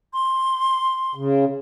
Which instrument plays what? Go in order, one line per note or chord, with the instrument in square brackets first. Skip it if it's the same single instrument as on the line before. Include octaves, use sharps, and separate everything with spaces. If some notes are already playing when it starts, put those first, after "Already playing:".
[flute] C6
[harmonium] C#3